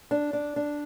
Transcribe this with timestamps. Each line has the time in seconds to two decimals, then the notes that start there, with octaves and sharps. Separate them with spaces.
0.11 D4
0.33 D4
0.56 D4